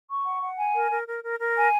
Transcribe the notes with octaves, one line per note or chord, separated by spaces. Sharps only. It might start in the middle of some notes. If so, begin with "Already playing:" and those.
C#6
F#5
F#5
G#5
A#4
A#4
A#4
A#4
A#4
G#5